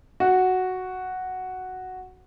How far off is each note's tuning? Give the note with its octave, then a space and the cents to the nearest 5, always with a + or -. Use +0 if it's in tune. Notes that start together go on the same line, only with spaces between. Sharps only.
F#4 +0